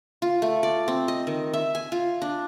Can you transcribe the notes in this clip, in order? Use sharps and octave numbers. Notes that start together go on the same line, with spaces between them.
F4
A3
D5
C4
D#5
D#3
E5
G#5
F4
D4